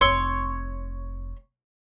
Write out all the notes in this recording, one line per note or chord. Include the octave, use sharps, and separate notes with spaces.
F1 C4 C#5 C6 E6